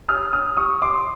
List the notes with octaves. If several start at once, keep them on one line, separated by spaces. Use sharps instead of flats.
D#6 F6
D#6 F6
C#6 D#6
C6 D6